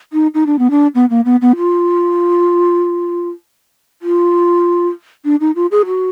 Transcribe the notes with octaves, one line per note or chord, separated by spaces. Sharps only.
D#4
D#4
D4
B3
D4
B3
A#3
B3
B3
F4
F4
D4
D#4
F4
G#4
F#4